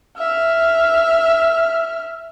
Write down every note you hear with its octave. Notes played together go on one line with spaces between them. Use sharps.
E5 F6